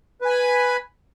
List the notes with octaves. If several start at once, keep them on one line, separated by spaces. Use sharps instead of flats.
B4 G#5 B5